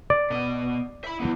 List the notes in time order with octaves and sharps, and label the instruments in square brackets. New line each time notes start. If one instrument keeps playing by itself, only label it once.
[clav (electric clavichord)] D5
[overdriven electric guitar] B2 D#5
E5 B5
E3 B3